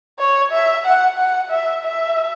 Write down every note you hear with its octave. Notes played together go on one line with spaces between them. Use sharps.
C#5
E5
F#5
F#5
E5
E5